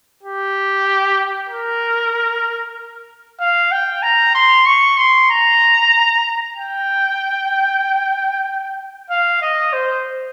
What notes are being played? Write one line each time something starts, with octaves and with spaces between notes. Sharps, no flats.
G4
A#4
F5
G5
A#5
C6
C#6
C6
A#5
G5
F5
D#5
C5